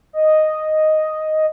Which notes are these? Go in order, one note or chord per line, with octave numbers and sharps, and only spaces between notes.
D#5